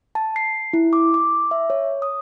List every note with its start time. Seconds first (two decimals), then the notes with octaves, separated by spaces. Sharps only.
0.15 A5
0.36 C7
0.73 E4
0.93 D6
1.14 D6
1.51 E5
1.70 C#5
2.02 D#6